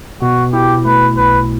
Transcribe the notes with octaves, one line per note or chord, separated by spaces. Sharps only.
B2 F#4
E4 G4
A3 B4
B1 B4